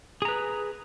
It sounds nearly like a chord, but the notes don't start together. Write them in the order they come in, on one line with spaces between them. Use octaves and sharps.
G#4 A#5 B4